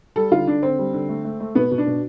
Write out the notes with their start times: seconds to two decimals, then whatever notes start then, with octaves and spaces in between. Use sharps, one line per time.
0.16 G3 A4
0.32 D3 F4
0.47 D3 D4
0.62 D3 C4
0.78 G3
0.93 D3
1.09 A3
1.24 A3
1.40 A3
1.55 B2 B3
1.71 B2
1.78 D4
1.87 B2